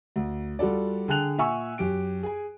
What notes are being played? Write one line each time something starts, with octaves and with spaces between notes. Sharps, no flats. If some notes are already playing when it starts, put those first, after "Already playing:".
D2
G3 F4 F#4 A4 D5
D3 G#4 G5 A5 F#6 F7
A#2 E5 F#5 G#5 C#6 E6
F#2 G4 D7
G#4 G#5